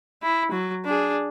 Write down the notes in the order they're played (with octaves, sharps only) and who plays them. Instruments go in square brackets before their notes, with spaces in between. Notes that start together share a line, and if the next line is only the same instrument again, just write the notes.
[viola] E4
F#3
D4 G#4